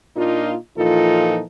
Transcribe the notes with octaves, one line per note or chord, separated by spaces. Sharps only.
A#2 A#3 D4 D#4 F4
A#2 E3 F3 D#4 F4 A4